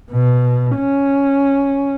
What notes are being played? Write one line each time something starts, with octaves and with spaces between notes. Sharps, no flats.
B2
C#4